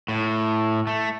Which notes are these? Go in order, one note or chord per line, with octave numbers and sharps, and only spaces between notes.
A2
A3